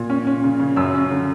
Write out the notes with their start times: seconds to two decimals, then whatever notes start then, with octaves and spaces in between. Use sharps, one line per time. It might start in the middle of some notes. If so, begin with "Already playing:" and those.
Already playing: A#2
0.09 C#4
0.27 C#4
0.44 C#3
0.59 C#3
0.76 F#2 E6
0.95 C#4
1.11 D3